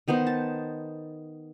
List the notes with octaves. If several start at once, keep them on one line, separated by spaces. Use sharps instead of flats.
D#3 B3 D#4 C5
A5